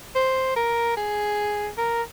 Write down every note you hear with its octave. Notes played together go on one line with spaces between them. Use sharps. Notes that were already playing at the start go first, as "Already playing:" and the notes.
C5
A#4
G#4
A#4